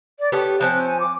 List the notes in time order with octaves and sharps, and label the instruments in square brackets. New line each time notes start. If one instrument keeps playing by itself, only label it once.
[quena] D5
[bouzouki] B3 G4 A4 [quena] C#5
[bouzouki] F3 C4 C#4 [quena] F#6
[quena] G#5
D6